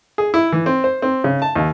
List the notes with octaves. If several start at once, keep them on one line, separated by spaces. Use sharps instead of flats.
G#4
E4
E3
C4
C5
C4
C#3
A5
D#2